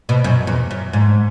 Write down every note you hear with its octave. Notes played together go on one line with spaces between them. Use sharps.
B2
F#2
E2
F#2
G#2